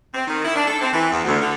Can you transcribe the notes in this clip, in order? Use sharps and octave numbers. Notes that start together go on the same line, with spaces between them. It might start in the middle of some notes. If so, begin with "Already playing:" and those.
C4
D#3
E4
D4
A4
C4
E3
E2
D2
D3